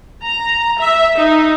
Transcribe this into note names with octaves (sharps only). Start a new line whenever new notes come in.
A#5
E5
D#4